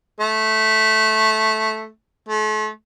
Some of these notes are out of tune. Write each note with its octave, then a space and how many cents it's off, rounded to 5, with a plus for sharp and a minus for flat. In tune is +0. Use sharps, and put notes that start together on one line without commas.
A3 -10
A3 -40